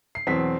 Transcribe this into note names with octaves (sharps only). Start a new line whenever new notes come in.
C7
E2 B2 F#3 C4 B6